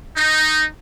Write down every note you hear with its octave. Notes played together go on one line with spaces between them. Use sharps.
D#4